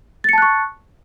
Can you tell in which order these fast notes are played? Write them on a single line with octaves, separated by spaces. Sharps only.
A6 C#7 A5 F#6 C#6